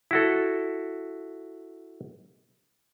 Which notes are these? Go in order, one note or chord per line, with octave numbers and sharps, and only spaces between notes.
E4 F#4 A4